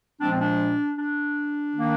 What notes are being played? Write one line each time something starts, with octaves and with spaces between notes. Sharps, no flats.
A#2 F3 G#3 C4 D4
C4
D4
D4
D#3 A#3